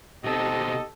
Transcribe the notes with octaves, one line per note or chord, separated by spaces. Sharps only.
B2 C4 D#4 G4 A4 D#5